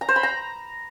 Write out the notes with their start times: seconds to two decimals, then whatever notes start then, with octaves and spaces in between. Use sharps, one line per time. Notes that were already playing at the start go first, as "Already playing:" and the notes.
0.01 A#5
0.09 C5
0.16 B5
0.23 A#5